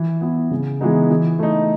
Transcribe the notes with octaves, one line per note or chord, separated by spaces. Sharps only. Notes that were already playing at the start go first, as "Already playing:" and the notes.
Already playing: E3
B3 E4
C#3
E3 G#3 B3 D#4
E3
A3 D#4